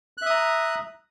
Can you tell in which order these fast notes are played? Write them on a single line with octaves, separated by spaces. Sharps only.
F#6 E5 D#6 A#5